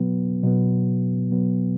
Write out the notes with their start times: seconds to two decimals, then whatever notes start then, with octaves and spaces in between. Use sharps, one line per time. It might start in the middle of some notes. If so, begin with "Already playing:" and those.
Already playing: B2 F#3 B3
0.43 B2 F#3 B3
1.30 B2 F#3 B3